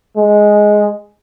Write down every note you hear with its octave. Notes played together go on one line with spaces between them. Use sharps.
G#3